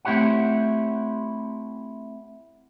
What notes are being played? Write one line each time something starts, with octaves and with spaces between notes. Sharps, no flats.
A3 C4 E4 G4 C#5 F#5